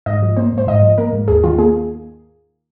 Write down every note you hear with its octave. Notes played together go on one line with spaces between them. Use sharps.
G#2 D#5
F3
A#3 C5
G#2 C5
G#2 D#5
F3
A#3 A#4
G#2
D#2 G#4
D#3 F4
A#3 G#4